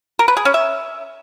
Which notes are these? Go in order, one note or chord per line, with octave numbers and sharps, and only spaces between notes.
A#4
B4
G#4
C#4
E5